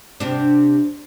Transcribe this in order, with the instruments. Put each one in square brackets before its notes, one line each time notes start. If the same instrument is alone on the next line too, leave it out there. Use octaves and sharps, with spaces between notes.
[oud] C3 D4